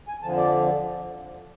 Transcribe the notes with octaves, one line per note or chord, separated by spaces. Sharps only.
G#5
F2 D3 F3 A5
D5